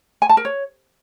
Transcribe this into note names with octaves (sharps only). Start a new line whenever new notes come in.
G#5
A5
A#4
C#5